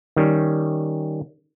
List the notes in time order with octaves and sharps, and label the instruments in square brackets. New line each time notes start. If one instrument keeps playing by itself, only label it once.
[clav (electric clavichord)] D#3 G3 C#4